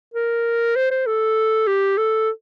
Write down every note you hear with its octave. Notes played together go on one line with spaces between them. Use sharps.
A#4
C5
C5
A4
G4
A4